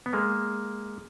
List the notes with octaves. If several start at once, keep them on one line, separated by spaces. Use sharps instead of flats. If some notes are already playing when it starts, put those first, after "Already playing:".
B3
G#3 A#3